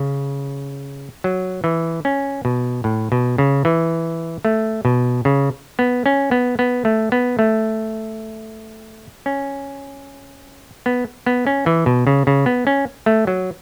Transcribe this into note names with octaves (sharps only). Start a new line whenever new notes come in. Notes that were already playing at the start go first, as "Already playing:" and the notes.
Already playing: C#3
F#3
E3
C#4
B2
A2
B2
C#3
E3
A3
B2
C#3
B3
C#4
B3
B3
A3
B3
A3
C#4
B3
B3
C#4
E3
B2
C#3
C#3
B3
C#4
A3
F#3